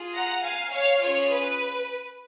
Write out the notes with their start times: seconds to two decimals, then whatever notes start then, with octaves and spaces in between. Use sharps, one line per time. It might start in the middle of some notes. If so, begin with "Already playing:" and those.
Already playing: F4 G#4
0.13 F#5 A#5
0.43 F5 G#5
0.72 C#5 F5
1.02 C#4 F4 G#4 C#5
1.31 B4